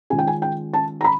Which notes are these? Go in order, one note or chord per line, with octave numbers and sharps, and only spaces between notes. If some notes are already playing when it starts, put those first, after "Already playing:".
D#3 G#3 C#4 F4 G#5
G5
G#5
G5
A5
A#5
B5